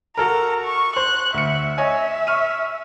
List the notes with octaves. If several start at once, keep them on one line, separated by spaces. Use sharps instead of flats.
F#4 A4 A#4 A#5
C#6
C5 F#6
D2 E5 C#7
C#5 D#5 E5 G#5
C#6 F6 D#7